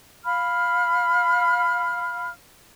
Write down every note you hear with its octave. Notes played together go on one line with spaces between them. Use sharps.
F5 B5 F6